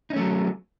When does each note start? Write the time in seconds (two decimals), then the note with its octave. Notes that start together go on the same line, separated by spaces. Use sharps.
0.10 D#4
0.13 C#4
0.16 A3
0.19 F#3